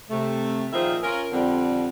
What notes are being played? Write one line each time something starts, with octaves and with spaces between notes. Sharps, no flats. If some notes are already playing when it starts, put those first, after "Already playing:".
C3 A3
A#2 D#3 F3 G#4 C5 E5
C#4 F4 A#4
F2 D3 G3 C4